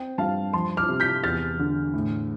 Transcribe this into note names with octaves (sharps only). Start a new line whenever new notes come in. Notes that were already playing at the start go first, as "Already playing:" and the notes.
Already playing: C4 G5
G2 F5 A5
F3 A5 C6
D6 F6
C3
G6 B6
E2 F6 A6
D3
A2